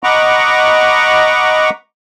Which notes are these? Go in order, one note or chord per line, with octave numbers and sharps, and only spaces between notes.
D#5 F#5 A#5 B5 C#6 D6